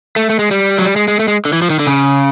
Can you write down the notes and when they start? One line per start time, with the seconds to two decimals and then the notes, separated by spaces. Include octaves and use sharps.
0.16 A3
0.30 A3
0.39 G#3
0.51 G3
0.78 F#3
0.85 G3
0.96 G#3
1.08 G#3
1.19 A3
1.28 G#3
1.45 D3
1.53 E3
1.62 F3
1.70 D#3
1.79 D3
1.87 C#3